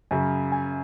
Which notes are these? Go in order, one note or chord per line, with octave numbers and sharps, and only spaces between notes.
F#2 C#3
G#5